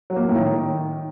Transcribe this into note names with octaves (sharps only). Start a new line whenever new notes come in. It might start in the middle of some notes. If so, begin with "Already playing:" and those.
F#3
A#3
A#2
A2
D#3